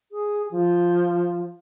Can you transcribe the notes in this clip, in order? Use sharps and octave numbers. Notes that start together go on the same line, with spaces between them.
G#4
F3